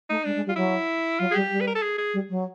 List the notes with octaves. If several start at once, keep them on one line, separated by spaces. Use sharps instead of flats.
A3 D#4
G#3 D4
G#3
G3
F4
F#3 E4
F#3 F4
G#4
G3 G4
G3
B4
A#4
A4
G#4
G#4
G3
F#3